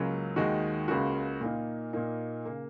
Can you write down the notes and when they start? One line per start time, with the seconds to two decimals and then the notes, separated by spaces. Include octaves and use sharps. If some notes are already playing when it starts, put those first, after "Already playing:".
Already playing: C#2 C#3 F#3 A#3 C#4
0.36 D#2 D#3 G#3 D#4 F#4
0.88 C#2 C#3 A#3 C#4 F#4
1.41 A#2 A#3 D#4
1.93 A#2 A#3 D#4
2.45 C#3 A#3